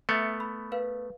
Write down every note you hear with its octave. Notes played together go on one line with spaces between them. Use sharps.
A3 B3 E5 A6 C#7
B5
A#4 B4 F5